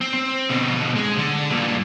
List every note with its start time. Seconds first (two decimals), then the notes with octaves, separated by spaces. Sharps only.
0.01 C4
0.14 C4
0.49 B2 D3
0.96 G#3
1.18 D3
1.50 G2 A#2